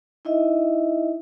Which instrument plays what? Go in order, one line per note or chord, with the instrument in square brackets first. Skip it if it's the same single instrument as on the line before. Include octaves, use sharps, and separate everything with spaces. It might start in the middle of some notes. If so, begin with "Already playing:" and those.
[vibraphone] D#4 E4 D#5 E5